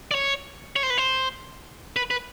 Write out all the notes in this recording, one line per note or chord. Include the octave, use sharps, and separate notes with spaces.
D5
C#5
C#5
C5
B4
C5
B4
B4